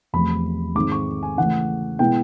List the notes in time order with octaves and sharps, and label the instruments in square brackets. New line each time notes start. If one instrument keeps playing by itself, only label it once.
[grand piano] E2 C3 F3 A3 B5
G#2 D#3 G#3 C4 D#4 D6
C#6
G#5
C#3 E3 A3 F#5
B2 G#3 B3 E4 G5